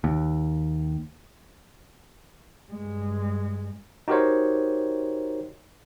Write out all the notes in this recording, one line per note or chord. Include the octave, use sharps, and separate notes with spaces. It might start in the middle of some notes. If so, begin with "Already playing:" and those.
D#2
G2 G#3
D#4 F#4 G4 A#4 C5 C#5